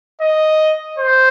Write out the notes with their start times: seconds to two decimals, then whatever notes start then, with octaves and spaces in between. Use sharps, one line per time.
0.22 D#5
0.99 C5